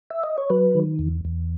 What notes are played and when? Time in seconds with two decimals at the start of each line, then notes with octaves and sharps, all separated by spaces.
0.11 E5
0.24 D#5
0.38 C#5
0.50 F#3 B4
0.75 D#3
0.99 E2
1.25 E2